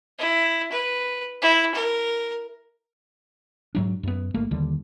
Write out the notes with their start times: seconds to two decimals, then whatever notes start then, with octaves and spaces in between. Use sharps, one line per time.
0.19 E4
0.72 B4
1.42 E4
1.74 A#4
3.75 G#2 F#3 D4
4.03 F#2 B3
4.34 G1 A3 A#3
4.51 D#2 D3 D#3 G3